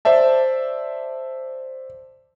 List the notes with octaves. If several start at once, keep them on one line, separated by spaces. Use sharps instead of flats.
C5 D5 E5 A5